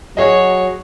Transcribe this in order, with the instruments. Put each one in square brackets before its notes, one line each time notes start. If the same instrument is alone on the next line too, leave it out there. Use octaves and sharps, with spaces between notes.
[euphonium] F#3 [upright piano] F#4 G#4 D#5 [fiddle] C#5